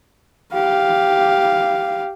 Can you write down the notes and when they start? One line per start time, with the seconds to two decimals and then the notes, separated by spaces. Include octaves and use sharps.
0.53 G4 F5